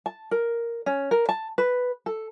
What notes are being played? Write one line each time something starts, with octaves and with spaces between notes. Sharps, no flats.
A5
A#4
C#4
A#4
A5
B4
A4